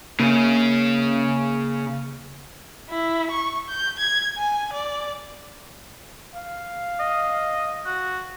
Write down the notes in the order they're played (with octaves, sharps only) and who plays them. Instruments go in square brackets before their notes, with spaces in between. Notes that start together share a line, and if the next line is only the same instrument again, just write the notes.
[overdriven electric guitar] C#3 C#4 [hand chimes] A#3
[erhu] E4
C#6
G6
G#6
G#5
D5
[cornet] F5
[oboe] D#5
F#4